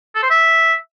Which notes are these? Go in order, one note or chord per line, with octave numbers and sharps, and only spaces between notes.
A4
C5
E5